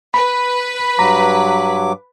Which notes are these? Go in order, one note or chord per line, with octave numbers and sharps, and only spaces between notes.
B4 B5
G2 F#3 A#5 D6